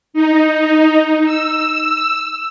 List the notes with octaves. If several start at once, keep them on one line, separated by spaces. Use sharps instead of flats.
D#4
E6